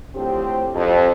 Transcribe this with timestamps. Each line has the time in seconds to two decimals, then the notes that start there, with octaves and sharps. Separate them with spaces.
0.15 A2 D3 F3 C4 G4
0.75 F2